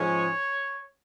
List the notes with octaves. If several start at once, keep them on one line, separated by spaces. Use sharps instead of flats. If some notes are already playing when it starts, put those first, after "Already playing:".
Already playing: G#2 F3 G#3 C#4 C#5